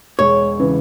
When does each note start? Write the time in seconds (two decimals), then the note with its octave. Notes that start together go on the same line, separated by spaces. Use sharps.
0.19 E1 C#5
0.59 C#3 E3